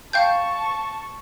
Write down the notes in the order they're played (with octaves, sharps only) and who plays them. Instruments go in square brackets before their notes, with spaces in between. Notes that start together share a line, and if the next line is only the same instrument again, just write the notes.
[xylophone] F5 G5 G6 [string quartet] A5 C#6